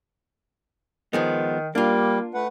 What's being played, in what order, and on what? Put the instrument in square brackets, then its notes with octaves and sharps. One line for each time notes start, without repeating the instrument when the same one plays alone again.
[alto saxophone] D#3 [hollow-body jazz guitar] F3 G#3 B3
[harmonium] G3 [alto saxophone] A#3 [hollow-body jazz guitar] D4 F4
[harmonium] A3 B4 F#5